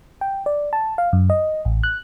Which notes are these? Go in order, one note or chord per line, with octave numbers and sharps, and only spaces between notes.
G5
D5
A5
F5
F#2
D#5
A1
F#6